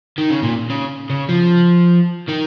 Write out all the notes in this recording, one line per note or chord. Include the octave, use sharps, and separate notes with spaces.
D#3
C#3
A#2
C#3
C#3
F3
D#3